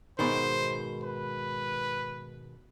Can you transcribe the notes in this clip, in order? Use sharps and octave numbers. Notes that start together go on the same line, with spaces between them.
G#2 B2 D#3 C5
B4